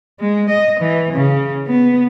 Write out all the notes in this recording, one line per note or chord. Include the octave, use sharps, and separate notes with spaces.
G#3
D#5
E3
C#3
B3